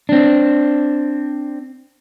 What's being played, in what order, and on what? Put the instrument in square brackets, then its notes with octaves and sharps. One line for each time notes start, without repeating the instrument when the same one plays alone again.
[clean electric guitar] C4 D4